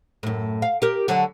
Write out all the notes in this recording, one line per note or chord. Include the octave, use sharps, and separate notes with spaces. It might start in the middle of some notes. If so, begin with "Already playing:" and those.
F#2 A2
F5
G4 A#4
D3 F#3 A4